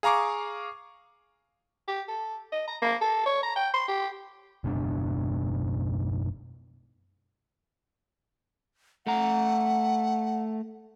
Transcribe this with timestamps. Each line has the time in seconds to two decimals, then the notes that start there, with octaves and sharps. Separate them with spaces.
0.03 G#4 F5 A#5 C#6 D6
1.88 G4
2.08 A4
2.52 D#5
2.67 A#5
2.81 A#3
3.01 A4
3.26 C#5
3.43 A#5
3.56 G5
3.74 C6
3.88 G4
4.64 F#1 B2 G#3 D4
9.07 A3 F#5 A#5